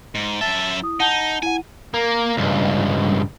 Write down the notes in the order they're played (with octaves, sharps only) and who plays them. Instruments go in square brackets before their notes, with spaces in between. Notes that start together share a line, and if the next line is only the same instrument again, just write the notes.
[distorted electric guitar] G#2
[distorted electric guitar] F#2 E5 [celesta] A5 A6 G7
[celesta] E4 D#6
[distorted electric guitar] D#4 [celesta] F#5 A5 G6
[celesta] E4 F#5 [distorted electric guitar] G#5
[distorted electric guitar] A#3
C#2 G2